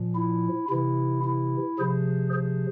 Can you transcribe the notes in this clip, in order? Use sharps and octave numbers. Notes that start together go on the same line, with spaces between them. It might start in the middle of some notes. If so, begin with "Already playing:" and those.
Already playing: A#2 F3
E4
C3 E3 E4
E4
C3 F3 G#4 C5
G#4 C5